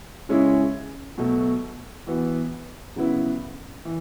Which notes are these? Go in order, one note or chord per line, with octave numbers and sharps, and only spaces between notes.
C#3 G#3 C#4 E4 G#4
B2 F#3 A3
E3 B3 F#4 B4
C#3 F#3 B3 E4 B4
E3